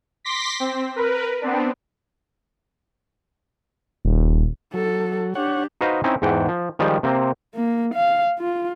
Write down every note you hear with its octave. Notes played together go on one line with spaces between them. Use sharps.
C6 D6 A#6 B6
C4
A#4 B4
B3 C4 D4
D#1
F#3 A4
D4 G4 C#5 F#5
D#4 F#4 B4 C5 D#5 F5
C4 C#4 D#4 E4
E2 G#2 F#5 G5
F3
D#3 F3 G3 G#3
C3 A#3 C4
A#3
F5
F4